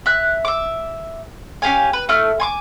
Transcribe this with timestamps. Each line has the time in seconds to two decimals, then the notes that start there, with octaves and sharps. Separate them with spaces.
0.06 E5 F#6
0.45 E5 D6
1.62 C#4 G4 F5 G#5
1.93 B4
2.09 A3 E4 F6
2.40 G#5 C6 D6